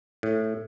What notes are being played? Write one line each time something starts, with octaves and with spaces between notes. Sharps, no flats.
A2